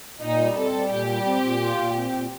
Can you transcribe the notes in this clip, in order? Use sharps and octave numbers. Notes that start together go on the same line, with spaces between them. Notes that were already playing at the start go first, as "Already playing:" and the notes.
A#2 D#4
G3
C4 A4
G3
A#2 G4
G3
C4
A#2
F4
A#2
C4
A#2